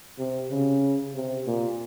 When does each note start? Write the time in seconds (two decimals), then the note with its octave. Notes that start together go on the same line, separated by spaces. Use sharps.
0.19 C3
0.50 C#3
1.15 C3
1.47 A#2